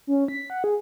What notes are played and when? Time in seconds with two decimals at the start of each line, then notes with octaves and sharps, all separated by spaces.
0.07 C#4
0.28 B6
0.50 F#5
0.64 G#4